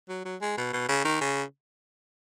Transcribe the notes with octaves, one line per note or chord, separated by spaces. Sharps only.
F#3
F#3
G#3
B2
B2
C#3
D#3
C#3